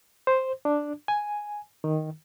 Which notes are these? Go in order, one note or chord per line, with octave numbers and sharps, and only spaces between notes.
C5
D4
G#5
D#3